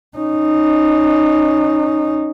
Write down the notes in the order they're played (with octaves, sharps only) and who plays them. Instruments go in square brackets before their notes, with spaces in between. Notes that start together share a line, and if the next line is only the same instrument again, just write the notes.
[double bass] C#4 D#4